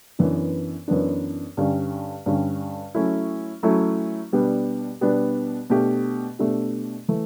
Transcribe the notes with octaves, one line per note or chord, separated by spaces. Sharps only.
F#2 E3 B3 D4
F#2 E3 B3 D4
G2 D3 G3 C#4
G2 D3 G3 C#4
F#3 A3 C#4 E4
F#3 A3 C#4 E4
B2 G3 B3 D4
B2 G3 B3 D4
B2 A3 D4 G4
B2 A3 D4 G4
E3 A3